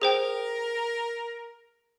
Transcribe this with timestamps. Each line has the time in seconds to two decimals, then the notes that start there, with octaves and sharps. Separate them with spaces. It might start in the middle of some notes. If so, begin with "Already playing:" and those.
0.02 G#4 A#4 C5 G5